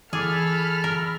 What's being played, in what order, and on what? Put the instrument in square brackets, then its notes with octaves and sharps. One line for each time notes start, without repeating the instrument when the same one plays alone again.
[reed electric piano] E3 D6 [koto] G#4 [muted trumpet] A4 [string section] B5 F6
[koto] A#4